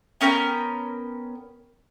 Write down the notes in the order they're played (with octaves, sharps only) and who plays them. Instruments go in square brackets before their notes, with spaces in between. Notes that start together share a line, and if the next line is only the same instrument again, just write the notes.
[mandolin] B3 C#4 A#4 G5